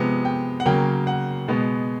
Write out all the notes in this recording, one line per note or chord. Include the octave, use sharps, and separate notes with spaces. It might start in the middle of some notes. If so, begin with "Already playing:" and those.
Already playing: C3 F3 G#3 B3
G5
F#5
C#3 F#3 A#3 G5
F#5
B2 G#3 B3